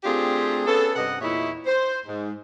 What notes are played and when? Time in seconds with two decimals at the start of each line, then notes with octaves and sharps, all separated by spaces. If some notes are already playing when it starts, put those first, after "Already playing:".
0.04 A3 C4 D4 F4 G4 G#4
0.66 B3 C#4 G#4 A4
0.95 G2 C3 B4 D#5 F#5
1.21 E2 A#2 D#4 E4 C#5 E5
1.66 C5
2.06 G#2